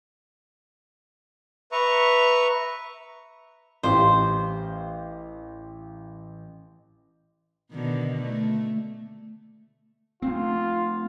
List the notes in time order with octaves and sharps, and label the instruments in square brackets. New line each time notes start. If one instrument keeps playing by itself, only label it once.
[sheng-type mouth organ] B4 E5 A#5 C#6
[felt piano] A1 G4 F5 [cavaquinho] C5
[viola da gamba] B2 D3 D#3
A3
[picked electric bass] A3 C4 [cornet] F4